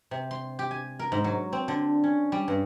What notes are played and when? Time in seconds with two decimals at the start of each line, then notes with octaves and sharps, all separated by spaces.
0.11 C3
0.31 C6
0.59 G4
0.71 G#5
0.99 A#4
1.12 G#2
1.24 F#3
1.53 C4
1.68 D3
2.04 C#4
2.32 G3
2.48 G2